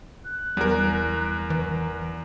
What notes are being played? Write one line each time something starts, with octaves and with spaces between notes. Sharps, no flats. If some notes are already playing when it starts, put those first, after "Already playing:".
F#6
E2 G3 A#4
E3